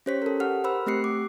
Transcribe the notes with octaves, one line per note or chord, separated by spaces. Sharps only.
C#4 G4 C5 C#5 B6
A4 A#4
G4 F#5 F6
A#4 C5 B5 E6
A3 C4 G4 F#6 C7 C#7
D6